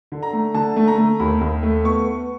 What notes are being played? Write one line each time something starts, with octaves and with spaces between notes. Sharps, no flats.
D3
A#5
A3
D3 A5
A3
A#5
A3
D#2 B5
D#2
A3
B3 C#6
B3